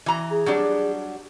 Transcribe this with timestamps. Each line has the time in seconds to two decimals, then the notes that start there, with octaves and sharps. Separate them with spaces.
0.06 E3 A#5
0.31 G#4
0.46 F#3 G3 D4